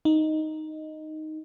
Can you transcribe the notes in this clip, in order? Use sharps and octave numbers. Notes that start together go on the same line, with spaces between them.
D#4